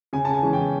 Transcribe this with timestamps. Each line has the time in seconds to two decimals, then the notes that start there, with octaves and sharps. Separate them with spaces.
0.13 C#3 G#5
0.25 A5
0.33 G#5
0.42 E3 G#3 C#4
0.53 G5